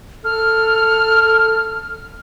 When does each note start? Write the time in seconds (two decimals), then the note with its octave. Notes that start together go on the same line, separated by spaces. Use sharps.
0.25 A4 F6